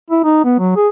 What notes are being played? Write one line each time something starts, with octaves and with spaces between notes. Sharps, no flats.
E4
D#4
B3
F#3
G#4